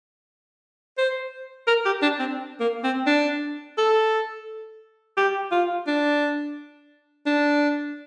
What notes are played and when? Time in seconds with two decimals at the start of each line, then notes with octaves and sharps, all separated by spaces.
0.98 C5
1.67 A#4
1.85 G4
2.02 D4
2.19 C4
2.60 A#3
2.84 C4
3.07 D4
3.78 A4
5.17 G4
5.51 F4
5.87 D4
7.26 D4